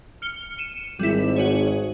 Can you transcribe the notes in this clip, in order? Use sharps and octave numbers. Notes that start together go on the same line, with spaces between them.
F6 C#7 G7
C#7 D#7 E7
G#1 G3 E4
F#4 G#4 C#5